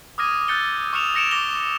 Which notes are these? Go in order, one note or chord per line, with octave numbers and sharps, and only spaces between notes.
D6 D#6 F6 G#6 A#6 D#7
E6 F#6 G6 A6 C#7 G7
C#6 D#6 F6 C#7 E7 F7
E6 A#6 C#7 D7 E7 F7
D6 A#6 G7